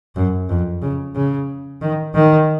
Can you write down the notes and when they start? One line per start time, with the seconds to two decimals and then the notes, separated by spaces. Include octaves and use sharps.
0.16 F#2
0.49 F2
0.82 C#3
1.16 C#3
1.81 D#3
2.15 D#3